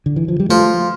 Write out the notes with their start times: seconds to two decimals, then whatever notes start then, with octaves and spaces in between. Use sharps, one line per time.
0.06 D3
0.16 E3
0.28 F3
0.40 G3
0.49 F3 A3